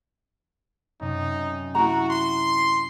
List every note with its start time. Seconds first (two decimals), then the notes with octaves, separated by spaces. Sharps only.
1.00 F#2 C3 D#4
1.75 E4 F#4 A#5
2.10 C6